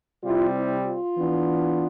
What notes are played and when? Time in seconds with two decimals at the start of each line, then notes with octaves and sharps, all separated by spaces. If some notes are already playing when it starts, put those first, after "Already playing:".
0.22 C3 G3 C4 E4 F4
0.54 E4
0.85 F4
1.16 E3 B3 D4